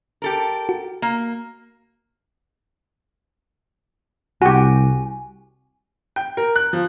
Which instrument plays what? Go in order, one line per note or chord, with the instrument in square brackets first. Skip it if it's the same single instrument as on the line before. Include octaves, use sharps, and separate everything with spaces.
[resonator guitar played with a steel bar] G4 A4 A#4
[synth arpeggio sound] F#4
[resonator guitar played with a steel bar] A#3
[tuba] C2 [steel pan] F#4 G4 [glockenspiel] G#5
[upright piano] G5
A#4
F#6
F3